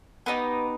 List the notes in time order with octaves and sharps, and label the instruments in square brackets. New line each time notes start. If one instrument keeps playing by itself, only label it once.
[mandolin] B3 D#4 G4 B4